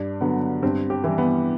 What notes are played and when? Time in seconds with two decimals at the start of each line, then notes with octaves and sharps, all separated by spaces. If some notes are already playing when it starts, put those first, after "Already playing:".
Already playing: G2 D4
0.21 D3 F#3 B3
0.63 G2 C4
0.90 G4
1.04 E3 G3
1.18 B3